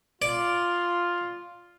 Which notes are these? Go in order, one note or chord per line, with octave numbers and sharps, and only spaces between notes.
F4 D5